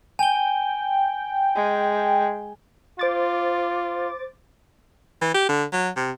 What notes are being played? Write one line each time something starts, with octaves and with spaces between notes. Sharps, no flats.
G5 G#5 G7
G#3
F4 C5 D6 A6
E3
G4
D3
F#3
C3